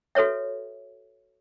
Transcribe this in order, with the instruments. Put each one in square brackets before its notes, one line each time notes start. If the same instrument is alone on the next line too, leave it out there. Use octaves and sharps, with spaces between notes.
[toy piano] F#4 A4 B4 C#5 E5